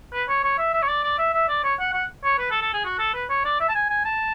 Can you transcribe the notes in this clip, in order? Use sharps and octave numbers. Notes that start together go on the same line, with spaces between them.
B4
C#5
C#5
E5
E5
C#5
D5
D5
E5
E5
D5
C#5
F#5
F#5
C#5
B4
A4
A4
G#4
F#4
A4
B4
C#5
D5
E5
A5
G#5
G#5
A5